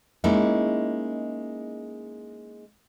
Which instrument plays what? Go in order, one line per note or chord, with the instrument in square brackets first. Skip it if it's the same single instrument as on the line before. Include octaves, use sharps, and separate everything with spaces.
[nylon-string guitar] G#3 A#3 C#4 D#4 E4